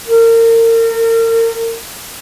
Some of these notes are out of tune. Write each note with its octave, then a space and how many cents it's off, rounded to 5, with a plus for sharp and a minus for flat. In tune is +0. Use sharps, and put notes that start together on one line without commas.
A#4 -35